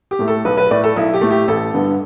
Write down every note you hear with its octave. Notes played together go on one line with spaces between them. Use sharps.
G4
A2 A3
A4
B1 B4
B4
A2 A3 D5
A4
B1 E4
G4
A2 A3
G4
A1 A4
G2 D3 B3